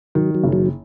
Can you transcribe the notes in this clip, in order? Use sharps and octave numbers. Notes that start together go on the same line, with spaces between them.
D#3 F#3
F#3
F#1
F#3